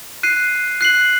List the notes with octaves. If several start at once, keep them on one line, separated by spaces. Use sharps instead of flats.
F#6 C7 D#7
F#6 C7 F#7